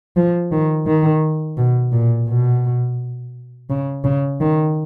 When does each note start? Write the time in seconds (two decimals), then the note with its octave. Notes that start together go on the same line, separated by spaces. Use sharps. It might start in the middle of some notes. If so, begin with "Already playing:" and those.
0.17 F3
0.52 D#3
0.87 D#3
1.58 B2
1.92 A#2
2.28 B2
3.70 C#3
4.04 C#3
4.41 D#3